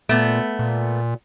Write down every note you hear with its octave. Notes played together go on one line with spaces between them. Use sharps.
A#2 A3 B3
A#2